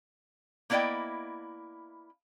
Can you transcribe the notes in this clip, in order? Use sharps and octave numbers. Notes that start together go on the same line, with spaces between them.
A#3 B3 E4 D5 D#5 G5